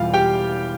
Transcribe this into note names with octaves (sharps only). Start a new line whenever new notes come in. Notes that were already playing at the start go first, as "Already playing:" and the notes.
Already playing: E1 E2 E3 G3 F4 F5
G4 G5